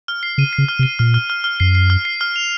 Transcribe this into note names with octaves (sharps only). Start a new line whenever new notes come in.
F6
C7
C#3 D#7
C7
C#3
F6
C3
D#7
A#2 F6
F6
F6
F6
F#2 C7
C7
F6
C7
F6
F7